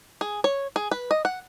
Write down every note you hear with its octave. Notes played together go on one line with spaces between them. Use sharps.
G#4
C#5
G#4
B4
D#5
F#5